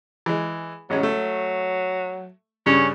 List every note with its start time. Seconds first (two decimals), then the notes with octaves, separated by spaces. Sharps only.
0.26 E3 G#3
0.90 A1 F#3 G#3 C#4
1.03 A3
2.66 G2 C#3 C#4 D4